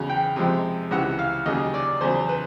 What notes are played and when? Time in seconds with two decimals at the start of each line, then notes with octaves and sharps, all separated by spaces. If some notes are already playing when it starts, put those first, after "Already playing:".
Already playing: E2 C#3 F#3
0.10 G5
0.36 F2 C3 F3 G#3
0.91 C#2 C3 E3 F#5
1.19 F5
1.46 D#2 C#3 F#3 D#5
1.74 D5
2.01 E2 C#3 F#3 C5
2.29 B4